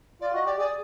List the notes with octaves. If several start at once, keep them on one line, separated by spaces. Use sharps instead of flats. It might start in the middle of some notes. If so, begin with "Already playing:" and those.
F4 D5
F#4 D#5
G4 D5
G#4 D5